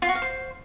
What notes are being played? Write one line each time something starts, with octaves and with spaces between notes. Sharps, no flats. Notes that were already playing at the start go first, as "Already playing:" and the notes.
F4
F#4
F5
C5